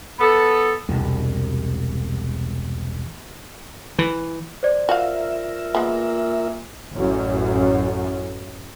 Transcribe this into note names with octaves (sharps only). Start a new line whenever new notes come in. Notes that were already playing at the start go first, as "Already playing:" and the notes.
B3 A4
E1 C2
E3
C5 D5
F4 F#4 A#4 E5 F5
A#2 G#3 B3
A1 F#2